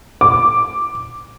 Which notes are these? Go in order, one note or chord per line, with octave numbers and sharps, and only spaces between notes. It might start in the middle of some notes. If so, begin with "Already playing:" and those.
D6